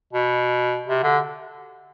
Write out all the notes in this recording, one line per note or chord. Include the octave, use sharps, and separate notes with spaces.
B2
C3
D3